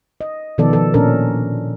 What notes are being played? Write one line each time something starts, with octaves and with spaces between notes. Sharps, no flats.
D#5
B2 D#3 F3 B3 A4 D5
F3 A4
A#2 C#4 D4 A4 A#4